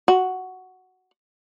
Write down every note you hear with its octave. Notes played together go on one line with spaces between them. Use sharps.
F#4